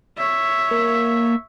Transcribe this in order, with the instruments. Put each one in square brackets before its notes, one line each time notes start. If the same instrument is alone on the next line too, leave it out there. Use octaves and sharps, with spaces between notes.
[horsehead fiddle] C#5 E5
[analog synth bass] A#3